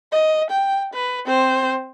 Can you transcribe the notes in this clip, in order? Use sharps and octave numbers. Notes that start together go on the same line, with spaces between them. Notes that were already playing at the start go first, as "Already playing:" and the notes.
D#5
G5
B4
C4 C5